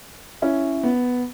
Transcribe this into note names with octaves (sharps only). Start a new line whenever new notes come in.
C#4 E4
B3